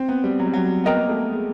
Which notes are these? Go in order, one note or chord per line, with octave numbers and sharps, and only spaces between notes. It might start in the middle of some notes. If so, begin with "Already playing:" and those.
Already playing: C4
B3
G3
F#3
G3
F#3
B3 A#4 D#5 G5 A#5
A#3
A3
G#3